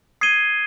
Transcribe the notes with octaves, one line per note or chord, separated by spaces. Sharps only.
D#6 G#6 C7 D#7 G7